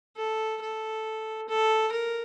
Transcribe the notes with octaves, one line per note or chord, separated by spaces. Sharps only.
A4
A4
A4
A#4